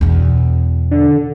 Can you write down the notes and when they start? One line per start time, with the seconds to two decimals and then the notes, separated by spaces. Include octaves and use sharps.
0.01 E2 B2
0.91 D3